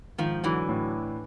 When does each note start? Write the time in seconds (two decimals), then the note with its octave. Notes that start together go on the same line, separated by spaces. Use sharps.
0.18 G#2 D#3 F3
0.44 D3 E3 F#3
0.69 A2